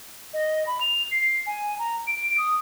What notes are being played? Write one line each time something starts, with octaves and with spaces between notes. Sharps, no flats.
D#5
B5
F7
C7
G#5
A#5
D7
D#6